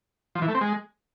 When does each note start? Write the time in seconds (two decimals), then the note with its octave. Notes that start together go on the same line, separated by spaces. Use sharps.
0.35 F3
0.42 E3
0.48 A3
0.55 C4
0.61 G#3